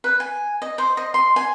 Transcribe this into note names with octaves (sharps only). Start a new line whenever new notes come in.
B4
G#5
D#5
C5
D#5
C6
G#5